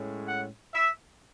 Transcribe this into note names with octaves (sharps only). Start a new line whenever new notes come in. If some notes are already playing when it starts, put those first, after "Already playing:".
Already playing: A2 G#3 C#4
F#5
E5